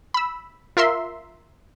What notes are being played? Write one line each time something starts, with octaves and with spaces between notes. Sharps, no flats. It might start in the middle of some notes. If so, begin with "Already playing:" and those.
B5 E6
F4 A#4 E5 C6